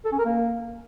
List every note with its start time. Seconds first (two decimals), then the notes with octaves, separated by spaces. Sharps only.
0.05 A4
0.12 C#4
0.18 A#4
0.25 A#3